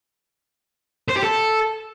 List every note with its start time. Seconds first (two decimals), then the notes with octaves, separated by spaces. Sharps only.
1.08 C5
1.15 G4
1.23 A4